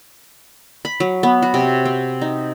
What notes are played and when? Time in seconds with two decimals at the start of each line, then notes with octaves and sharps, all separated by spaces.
0.85 B5
1.00 F#3
1.23 B3
1.42 F#4
1.54 C3
1.85 C4
2.21 D#4